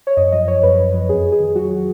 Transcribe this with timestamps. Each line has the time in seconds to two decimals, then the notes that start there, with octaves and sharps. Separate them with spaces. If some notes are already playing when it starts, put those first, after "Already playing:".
0.07 C#5
0.17 F#2 D#5
0.32 F3 D#5
0.47 F3 C#5
0.63 F#2 B4
0.78 F#2
0.94 F3
1.09 F2 G#4
1.25 F2
1.32 G#4
1.40 D#3
1.55 F#3 F#4